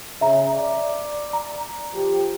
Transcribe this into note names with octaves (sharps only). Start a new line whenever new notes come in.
C#3 E5 A#5
D5
A#5
F3 G4